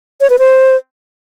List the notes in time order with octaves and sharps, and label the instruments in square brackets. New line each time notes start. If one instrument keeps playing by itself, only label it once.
[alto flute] C#5
B4
C5